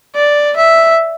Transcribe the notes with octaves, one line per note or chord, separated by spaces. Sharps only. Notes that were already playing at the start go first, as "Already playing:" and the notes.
D5
E5